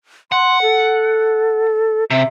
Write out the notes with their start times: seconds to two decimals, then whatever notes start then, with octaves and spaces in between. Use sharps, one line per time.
0.32 F#5 C6
0.62 A4
2.10 C3 E5